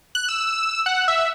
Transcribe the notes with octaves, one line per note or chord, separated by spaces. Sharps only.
F#6
E6
F#5
E5